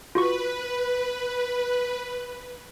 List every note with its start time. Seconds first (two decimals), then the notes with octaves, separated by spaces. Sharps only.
0.15 F4 F#4 B4 C#6